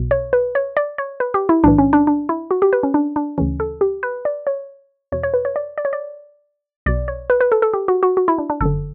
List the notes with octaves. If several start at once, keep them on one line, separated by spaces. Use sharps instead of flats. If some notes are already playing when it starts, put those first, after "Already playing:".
Already playing: B1 B2
C#5
B4
C#5
D5
C#5
B4
G4
E4
B1 A2 E3 D4
C#4
D4
D4
E4
F#4
G4
B4
C#4
D4
D4
D2 C#3 E3 C#4
A4
G4
B4
D5
C#5
E2 B2 C#5
C#5
B4
C#5
D5
D5
C#5
D5
B1 B2 D5
C#5
B4
B4
A4
A4
G4
F#4
F#4
F#4
E4
D4
D4
G1 F#2 D3 A4